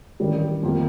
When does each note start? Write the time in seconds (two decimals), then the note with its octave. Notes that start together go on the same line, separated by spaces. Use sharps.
0.20 A1 G2 D#3 G3
0.63 F2 D#3 A#3